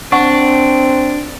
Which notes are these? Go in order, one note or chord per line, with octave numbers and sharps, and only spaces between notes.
C4 D4 F#5 C#6